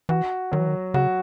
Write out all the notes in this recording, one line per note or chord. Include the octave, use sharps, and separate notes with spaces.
E3 F#4
D#3 F#3
E3
D#3
C#3 F#4